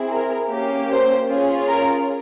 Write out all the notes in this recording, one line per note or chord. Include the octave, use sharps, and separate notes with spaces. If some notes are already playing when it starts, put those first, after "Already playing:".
Already playing: C4 E4 G#4
A#4
A#3 C#4 G4
C5
C#4 F4 G#4
A#4